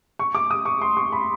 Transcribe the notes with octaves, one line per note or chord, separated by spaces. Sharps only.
C#6
D6
D#6
C#6
C6
C#6
B5